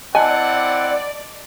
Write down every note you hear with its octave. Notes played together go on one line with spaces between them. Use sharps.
C4 E4 D5 D#5 F#5 G#5 A5